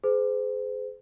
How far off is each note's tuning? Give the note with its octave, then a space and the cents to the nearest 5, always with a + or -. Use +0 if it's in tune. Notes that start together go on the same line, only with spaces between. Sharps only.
G#4 +20 C5 -40